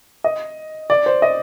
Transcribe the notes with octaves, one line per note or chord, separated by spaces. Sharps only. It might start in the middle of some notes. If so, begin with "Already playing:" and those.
D#5
D5
C5
D#5